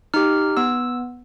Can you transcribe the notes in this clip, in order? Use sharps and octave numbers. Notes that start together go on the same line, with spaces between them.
D#4 G4 F6
B3 E6